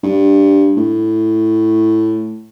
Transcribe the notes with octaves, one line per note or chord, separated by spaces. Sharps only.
G2
A2